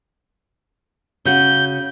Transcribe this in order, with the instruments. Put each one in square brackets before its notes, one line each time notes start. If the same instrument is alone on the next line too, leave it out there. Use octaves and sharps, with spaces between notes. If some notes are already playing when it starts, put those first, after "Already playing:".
[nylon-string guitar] C#3 F#4 [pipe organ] G6